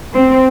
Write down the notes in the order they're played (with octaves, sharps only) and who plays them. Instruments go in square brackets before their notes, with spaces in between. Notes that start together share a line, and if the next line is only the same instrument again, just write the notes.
[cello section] C4